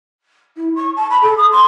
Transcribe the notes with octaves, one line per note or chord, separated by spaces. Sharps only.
E4
C#6
A5
B5
A4
D#6
C6